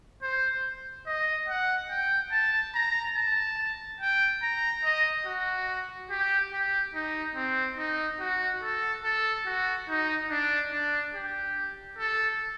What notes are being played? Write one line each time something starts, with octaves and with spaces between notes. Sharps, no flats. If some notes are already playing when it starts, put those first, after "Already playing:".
C5
D#5
F#5
G5
A5
A#5
A5
G5
A#5
D#5
F#4
G4
G4
D#4
C4
D#4
F#4
A4
A4
F#4
D#4
D4
D4
G4
A4